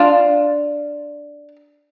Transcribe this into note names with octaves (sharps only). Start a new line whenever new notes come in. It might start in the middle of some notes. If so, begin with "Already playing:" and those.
Already playing: D4 F4